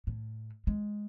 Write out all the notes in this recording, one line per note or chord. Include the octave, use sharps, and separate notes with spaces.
A2
G#3